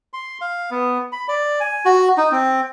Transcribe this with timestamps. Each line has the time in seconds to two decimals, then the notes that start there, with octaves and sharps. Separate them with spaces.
0.13 C6
0.41 F5
0.71 B3
1.12 B5
1.28 D5
1.60 G#5
1.85 F#4
2.17 D#4
2.32 C4